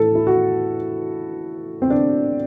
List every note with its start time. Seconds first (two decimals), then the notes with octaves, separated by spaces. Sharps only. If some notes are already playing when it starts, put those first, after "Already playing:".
Already playing: A2 E3 A4
0.15 E4
0.27 F#4
1.82 C4
1.90 D4